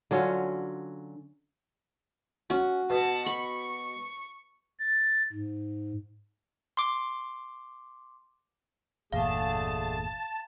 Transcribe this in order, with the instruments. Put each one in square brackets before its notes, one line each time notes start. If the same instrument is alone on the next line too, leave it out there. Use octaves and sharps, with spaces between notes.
[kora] D3 F#3 C#4 F4
[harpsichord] C#4 C#6 [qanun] F#4
[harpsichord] B2 [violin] F#5 A5
[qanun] B5 [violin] C#6
[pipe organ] A6
G#2
[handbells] C6 D6
[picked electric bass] G1 E2 A#2 [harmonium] D3 A3 G#4 [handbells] F5 [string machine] A5